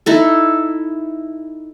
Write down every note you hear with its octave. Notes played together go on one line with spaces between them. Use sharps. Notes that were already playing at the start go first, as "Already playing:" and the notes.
D#4 E4 A4